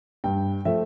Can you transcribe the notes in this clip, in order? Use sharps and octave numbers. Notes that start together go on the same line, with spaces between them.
G2 G5
F3 A3 E5